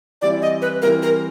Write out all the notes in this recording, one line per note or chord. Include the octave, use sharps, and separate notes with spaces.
E3 G3 C4 E4 D5
D#5
B4
E3 G3 C4 E4 A#4
A#4